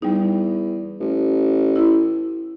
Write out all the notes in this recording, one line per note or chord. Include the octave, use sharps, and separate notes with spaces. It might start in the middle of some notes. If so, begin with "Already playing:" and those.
E2 G3 D#4
A1
E4